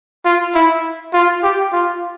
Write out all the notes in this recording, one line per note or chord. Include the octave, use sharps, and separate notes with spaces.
F4
E4
F4
G4
F4